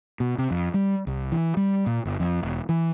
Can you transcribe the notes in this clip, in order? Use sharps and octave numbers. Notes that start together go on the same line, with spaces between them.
B2
C3
F2
G3
C2
E3
G3
A#2
G1
F2
E1
E3